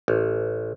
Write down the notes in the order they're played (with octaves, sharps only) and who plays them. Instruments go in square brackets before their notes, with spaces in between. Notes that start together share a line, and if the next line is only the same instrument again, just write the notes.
[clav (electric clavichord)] A1